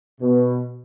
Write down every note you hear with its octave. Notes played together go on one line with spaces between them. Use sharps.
B2